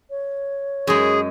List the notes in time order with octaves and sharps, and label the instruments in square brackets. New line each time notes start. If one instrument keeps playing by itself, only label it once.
[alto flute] C#5
[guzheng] F#2 G#3 [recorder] G#4